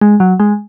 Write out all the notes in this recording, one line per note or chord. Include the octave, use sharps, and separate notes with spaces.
G#3
F#3
G#3